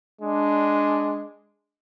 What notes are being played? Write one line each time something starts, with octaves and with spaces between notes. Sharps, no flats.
G#3 D4